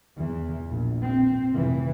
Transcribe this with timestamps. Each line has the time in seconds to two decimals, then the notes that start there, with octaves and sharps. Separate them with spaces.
0.17 E2 E3
0.70 A#1
1.02 C4
1.53 F1 E3